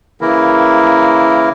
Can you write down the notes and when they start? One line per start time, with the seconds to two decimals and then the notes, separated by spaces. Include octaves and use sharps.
0.21 C#3 E3 A#3 E4 A#4